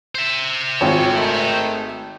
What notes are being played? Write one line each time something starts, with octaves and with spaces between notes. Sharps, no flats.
C5 E5
G#1 F4 C#5
D#3 A3